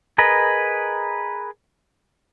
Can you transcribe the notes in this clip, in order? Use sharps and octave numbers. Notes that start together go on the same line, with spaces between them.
G#4 A#4 B4 D#5